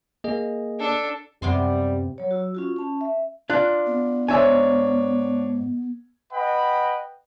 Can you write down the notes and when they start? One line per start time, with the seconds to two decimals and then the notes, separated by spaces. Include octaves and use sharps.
0.24 A#3 G#4 D#5
0.80 D4 A4
1.42 F#2 C3 G3 B3 C6
2.18 F#3 C#5
2.31 F#4 E6
2.55 C#4 F4 F#4
2.76 C#4 A5
3.01 E5
3.50 D4 F4 F#6
3.86 B3
4.28 G#2 D4 C#5 E5 G#5
6.32 B4 D#5 F#5 G5 B5